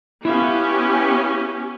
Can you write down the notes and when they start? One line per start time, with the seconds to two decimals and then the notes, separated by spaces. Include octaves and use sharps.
0.25 B3 C#4 E4 G4 E5 F5